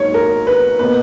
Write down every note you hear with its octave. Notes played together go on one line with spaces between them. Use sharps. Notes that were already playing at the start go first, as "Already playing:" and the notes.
Already playing: G#2 F#3 A#3 C#5
A#4
B4
B2 A#3 B4